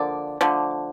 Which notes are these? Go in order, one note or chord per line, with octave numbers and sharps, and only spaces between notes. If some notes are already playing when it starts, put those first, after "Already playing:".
Already playing: D3 F3 A#3 D5
D3 F3 A3